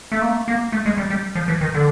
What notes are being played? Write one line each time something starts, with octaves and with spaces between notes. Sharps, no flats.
A3
A#3
A#3
A3
G#3
G3
G3
F3
E3
D#3
D3